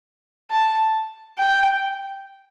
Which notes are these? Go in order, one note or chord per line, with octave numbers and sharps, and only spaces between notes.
A5
G5